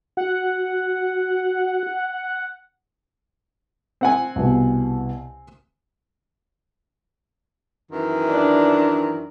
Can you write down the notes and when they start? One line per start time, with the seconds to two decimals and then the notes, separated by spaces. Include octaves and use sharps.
0.17 F#4 F#5
4.01 C4 F#5 G#5
4.36 C2 B2
7.91 F#2 D#3 E3
8.29 D4